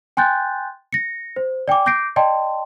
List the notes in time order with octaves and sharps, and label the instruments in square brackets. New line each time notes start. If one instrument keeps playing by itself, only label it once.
[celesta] G5 G#5 C6 F#6 G6 A6
A#6 C#7
C5
D5 G5 G#5 D6
D6 G6 A#6 C7 D7
D5 D#5 G5 A5 C6